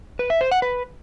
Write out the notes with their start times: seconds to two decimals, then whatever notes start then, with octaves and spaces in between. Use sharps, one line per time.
0.19 B4
0.30 E5
0.41 C5
0.51 F#5
0.62 B4